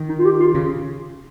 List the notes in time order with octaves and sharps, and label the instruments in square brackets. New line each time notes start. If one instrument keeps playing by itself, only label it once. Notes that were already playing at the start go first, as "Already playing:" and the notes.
Already playing: [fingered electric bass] D#3
[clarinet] D#4
F4
G4
F4
[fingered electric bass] C#3